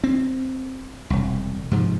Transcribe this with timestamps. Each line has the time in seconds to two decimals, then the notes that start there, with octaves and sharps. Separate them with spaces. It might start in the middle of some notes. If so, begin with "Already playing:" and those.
0.04 C4
1.10 E1 C2
1.71 G#2 C3 F3